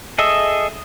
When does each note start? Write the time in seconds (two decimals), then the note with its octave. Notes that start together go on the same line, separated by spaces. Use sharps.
0.18 G#4 A4 D#5 E5